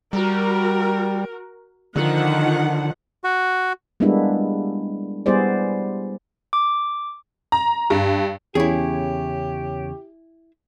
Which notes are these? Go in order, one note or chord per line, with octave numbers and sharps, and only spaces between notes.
G3 F#4 A#4
D3 D#3 F3 F#5
F#4
G3 G#3 A#3 B3 D4 E4
G3 B3 E4 G#4 C5 D5
D6
A#5
G2
E2 C#3 E4 G4 G#4 C#5